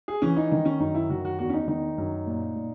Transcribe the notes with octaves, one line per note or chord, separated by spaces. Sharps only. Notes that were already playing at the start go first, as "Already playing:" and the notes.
G#4
E3 C#4
D#4
D#3 D#4
C#4
F#2 D#4
E4
D#3 F#4
F#4
E2 F#4
C#4
D#4
D#3 D#4
F#2
A#2
A#2